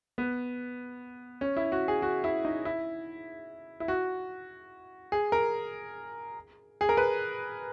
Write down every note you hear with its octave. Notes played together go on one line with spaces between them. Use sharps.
B3
C#4
E4
F#4
G#4
F#4
E4
D#4
E4
E4
F#4
G#4
A#4
G#4
A#4
B4